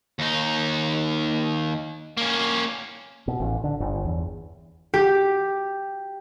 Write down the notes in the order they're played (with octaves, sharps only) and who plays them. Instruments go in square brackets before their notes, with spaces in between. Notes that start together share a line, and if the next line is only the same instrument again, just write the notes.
[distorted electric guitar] D#2 D#4
A#3 C#4
[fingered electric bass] B2
A1
D3
G1
E2
[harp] G4